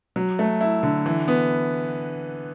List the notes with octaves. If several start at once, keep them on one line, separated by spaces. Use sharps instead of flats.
F#3
A3
E4
D3
E3
B3